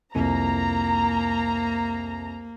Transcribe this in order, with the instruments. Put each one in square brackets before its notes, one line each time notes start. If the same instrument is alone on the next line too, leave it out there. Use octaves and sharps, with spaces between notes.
[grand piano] C2 F2 [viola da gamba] A#3 [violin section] A#5